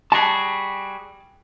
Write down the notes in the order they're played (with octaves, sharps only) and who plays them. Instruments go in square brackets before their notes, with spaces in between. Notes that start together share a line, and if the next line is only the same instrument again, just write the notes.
[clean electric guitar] G3 F#4 G#4 [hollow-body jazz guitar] A5